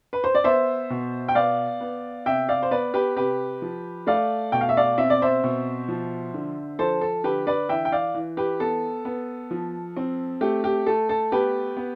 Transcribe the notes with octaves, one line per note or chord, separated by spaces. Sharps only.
B4
C5
D5
B3 C5 E5
B2
G5
B3 D5 F5
B3
C3 E5 G5
D5 F5
C5
B3 B4 D5
G4 B4
C3 G4 B4
F3
A3 D5 F5
B2 G5
F5
E5
D5 F5
C4 E5
D5
C5 E5
B2
F3
D3
F3 A4 C5
A4
D3 G4 B4
B4 D5
E3 E5 G5
G5
D5 F5
E3
G4 B4
B3 A4
B3
F3
C4
A3 G4
G4
A3 A4
A4
B3 G4 B4
B3